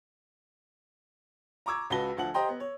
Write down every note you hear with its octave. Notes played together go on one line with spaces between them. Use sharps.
A#5 C#6 D6 E6 G#6
C#2 F#4 B4 A5 A#6 G7
D2 F3 F#5 F#7
G4 C5 D#5 G5 A#5 C6
B3
C#5